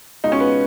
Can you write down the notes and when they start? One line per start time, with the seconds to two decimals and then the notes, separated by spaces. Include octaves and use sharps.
0.24 C#2 B2 D#4
0.32 C#4
0.40 B3